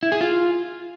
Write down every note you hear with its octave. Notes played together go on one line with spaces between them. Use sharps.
E4
G#4
F4